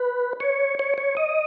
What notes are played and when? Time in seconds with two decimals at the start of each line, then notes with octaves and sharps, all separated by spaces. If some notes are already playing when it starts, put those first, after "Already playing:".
Already playing: B4
0.40 C#5
0.79 C#5
0.98 C#5
1.17 D#5